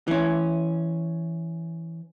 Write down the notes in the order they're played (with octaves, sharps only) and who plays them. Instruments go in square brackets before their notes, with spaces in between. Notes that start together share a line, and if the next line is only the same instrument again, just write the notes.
[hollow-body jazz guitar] E3 C#4